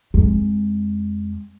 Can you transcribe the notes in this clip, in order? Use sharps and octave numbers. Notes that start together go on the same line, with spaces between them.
F2 G#3